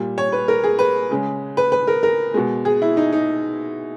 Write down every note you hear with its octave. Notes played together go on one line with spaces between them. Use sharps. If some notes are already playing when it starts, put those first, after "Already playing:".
Already playing: A#2 G3
C#5
B4
A#4
G#4
B4
C#3 G#3
B4
B4
A#4
A#4
B2 G#3
G#4
E4
D#4
D#4